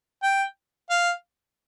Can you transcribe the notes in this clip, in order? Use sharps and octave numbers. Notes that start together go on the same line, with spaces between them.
G5
F5